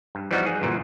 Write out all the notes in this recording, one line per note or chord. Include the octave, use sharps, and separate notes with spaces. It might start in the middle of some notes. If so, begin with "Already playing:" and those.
G2
E3 F3 G3 B3 D#4 F#4
G#4
G1 F#2 A#2 E3